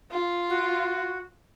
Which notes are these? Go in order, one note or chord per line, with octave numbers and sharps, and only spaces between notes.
F4
F#4